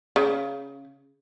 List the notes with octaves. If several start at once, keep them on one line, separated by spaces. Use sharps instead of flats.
C#3